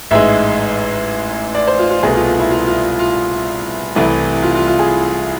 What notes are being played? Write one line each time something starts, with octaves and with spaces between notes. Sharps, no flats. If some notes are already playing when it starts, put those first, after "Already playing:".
A1 G#2 G#3 E5
D5
C5
F4
F4
C2 B2 A3 G#4
F4
F4
E4
F4
F4
F4
F4
C2 C3 E3 A3
F4
F4
F4
G#4